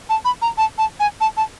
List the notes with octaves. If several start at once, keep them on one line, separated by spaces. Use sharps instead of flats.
A5
B5
A#5
A5
A5
G#5
A5
A5